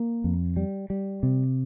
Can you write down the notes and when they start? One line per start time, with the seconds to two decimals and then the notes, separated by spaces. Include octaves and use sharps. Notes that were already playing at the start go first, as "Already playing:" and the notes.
Already playing: A#3
0.24 F2
0.57 G3
0.90 G3
1.23 C3